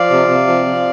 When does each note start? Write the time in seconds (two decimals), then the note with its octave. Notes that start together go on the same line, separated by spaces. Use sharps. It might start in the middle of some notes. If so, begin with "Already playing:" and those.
Already playing: F3 D5 F5
0.10 C3
0.29 C3
0.48 F3
0.66 F3